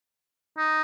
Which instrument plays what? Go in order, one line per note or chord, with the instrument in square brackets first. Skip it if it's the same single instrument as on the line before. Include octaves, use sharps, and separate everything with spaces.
[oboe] D#4